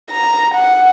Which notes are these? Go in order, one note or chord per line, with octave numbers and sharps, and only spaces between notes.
A#5
F#5